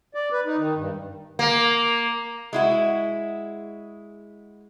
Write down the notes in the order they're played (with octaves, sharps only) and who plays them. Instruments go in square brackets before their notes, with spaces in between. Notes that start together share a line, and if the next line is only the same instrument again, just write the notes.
[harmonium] D5
B4
D#4
D#3
G2
[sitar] A#3
[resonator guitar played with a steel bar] G#3 E4 F#4